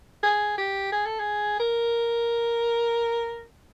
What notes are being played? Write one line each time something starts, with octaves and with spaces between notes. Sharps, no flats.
G#4
G4
G#4
A4
G#4
A#4